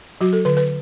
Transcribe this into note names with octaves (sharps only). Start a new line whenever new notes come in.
F#3 F#4
A4
D3 B4
B4